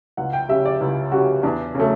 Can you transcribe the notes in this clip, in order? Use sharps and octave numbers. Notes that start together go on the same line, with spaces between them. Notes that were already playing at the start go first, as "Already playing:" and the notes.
C#2 F#5
G5
C#3 G3 E5
D5
C#2 E4
C#3 G3 F#4
E2 D4
C#3 F#3 A3